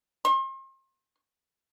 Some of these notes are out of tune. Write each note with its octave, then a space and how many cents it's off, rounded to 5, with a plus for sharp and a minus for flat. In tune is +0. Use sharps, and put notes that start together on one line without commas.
C6 +40